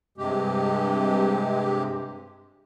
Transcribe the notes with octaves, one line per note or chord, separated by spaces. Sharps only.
G2 C3 G#3 G4